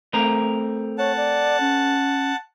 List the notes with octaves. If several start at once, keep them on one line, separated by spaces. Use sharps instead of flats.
A3 C4 A#4
C#5 F#5 A5
D5
C#4